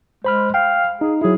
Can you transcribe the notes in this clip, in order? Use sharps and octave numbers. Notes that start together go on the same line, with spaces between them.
G#3 C5 B5 F6
F5 G5
D#4 G#4
F#3 E4 G#4